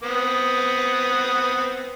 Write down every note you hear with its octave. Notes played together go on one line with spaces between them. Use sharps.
B3 C4 D#6